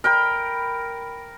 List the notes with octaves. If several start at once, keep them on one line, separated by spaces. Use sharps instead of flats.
A#4 G5 B5